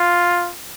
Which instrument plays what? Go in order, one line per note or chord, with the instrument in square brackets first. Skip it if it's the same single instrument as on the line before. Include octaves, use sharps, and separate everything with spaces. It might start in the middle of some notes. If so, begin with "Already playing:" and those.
Already playing: [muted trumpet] F4